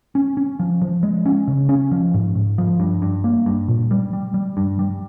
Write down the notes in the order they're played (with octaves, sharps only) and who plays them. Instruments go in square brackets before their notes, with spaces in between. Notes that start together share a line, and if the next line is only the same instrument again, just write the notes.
[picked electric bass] C#4
C#4
F3
F3
G#3
C#4
C#3
C#4
F3
G#2
G#2
F3
G2
G2
A#3
G2
A#2
G3
G3
G3
G2
G3